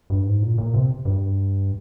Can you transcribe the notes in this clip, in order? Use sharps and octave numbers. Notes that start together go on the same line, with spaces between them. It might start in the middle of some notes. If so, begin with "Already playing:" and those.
G2
G#2
A#2
A#2
C3
G2